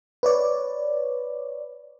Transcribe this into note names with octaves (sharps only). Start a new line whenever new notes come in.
B4 C#5 D5